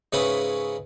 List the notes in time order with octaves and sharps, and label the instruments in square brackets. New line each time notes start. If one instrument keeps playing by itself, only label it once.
[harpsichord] G#2 C#3 C#4 E4 B4 D#6